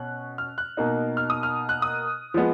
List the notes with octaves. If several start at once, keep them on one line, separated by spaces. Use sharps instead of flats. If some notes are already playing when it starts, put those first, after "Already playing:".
Already playing: B2 C#4 F#6
F6
F#6
B2 A#3 D#4
F6
D#6
F6
F#6
D#6
F3 G#3 B3